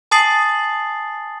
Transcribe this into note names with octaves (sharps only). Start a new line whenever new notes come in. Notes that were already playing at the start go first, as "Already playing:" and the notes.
G#5 A5 D#6 A6 C7 F#7